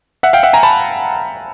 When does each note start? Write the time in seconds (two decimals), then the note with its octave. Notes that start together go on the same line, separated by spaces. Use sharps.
0.23 E5 F#5
0.33 F5 G5
0.43 E5 F#5
0.53 G#5 A#5
0.63 A5 B5